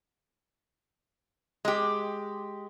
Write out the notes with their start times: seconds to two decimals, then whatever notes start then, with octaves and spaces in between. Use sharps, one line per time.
1.65 G#3 G4